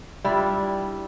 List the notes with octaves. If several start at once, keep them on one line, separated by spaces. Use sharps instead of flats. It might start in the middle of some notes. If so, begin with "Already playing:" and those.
G3 D4 E4 F4